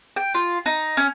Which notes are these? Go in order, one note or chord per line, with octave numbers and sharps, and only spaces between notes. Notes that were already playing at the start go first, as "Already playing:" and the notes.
G5
F4
D#4
C#4